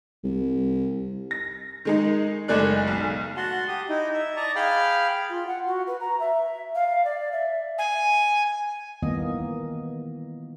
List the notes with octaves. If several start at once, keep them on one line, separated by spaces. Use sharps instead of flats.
C2
A#6
D#3 G#3 D#4
F#1 G#3 A3 G#4 D5 F#6
B1
F#4 F#5 A5 C6
G4 D#6
D#4 E4
E5
D5 D#5 A5 A#5 C#6
G#4 F5 G5 B5 F6
F4
F#5
F#4
B4
A#5
E5
F5
D5
E5
G#5
D#3 E3 G3 A#3 B3 D#5